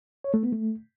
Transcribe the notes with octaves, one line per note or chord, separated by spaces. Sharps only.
C#5
A3
B3
A3